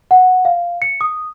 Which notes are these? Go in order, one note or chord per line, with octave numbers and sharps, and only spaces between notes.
F#5
F5
C#7
D#6